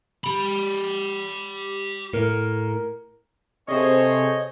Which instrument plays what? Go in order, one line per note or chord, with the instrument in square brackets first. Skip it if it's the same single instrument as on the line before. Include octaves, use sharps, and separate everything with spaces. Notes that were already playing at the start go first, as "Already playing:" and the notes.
[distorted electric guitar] G4 B5
[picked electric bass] A2 [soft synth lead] A#4
[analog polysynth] C3 G#4 C5 [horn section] C4 A4 C#5 [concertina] D#5